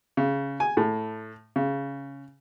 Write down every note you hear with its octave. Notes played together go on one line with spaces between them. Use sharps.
C#3
G#5
A2
C#3